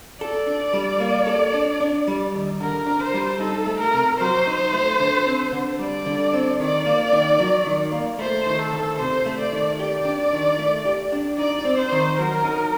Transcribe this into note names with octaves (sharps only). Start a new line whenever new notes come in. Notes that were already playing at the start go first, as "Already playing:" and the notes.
A4 D5
D4
G3
A#3
A4
D4
D4
G3
D#2
D3 A#4
D4
C5
G3
D#4 A4
A3
A#4
C3
F#3 C5
D#4
A3
D3
C4
D3
G3 D5
D3
C4
D#3 D5
A#3
D#3
F#3
D#3
A#3
A3 C5
D#3
A4
D2
C3 C5
A3
D5
D#3
G4 D5
D4
D#3
A3
G4
D4
D#4 D5
C4
C5
D#3
F#3 A#4
D#4